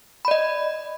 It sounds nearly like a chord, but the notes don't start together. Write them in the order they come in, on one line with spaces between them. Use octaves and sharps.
B5 D5 D#5